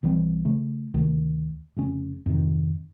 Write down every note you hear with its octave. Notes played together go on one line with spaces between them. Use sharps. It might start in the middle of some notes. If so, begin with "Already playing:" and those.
B1 E3 G3 C4
C#3 A3
D2 C3 D#3
F1 C#3 C#4
F2 G#2 C3 D#3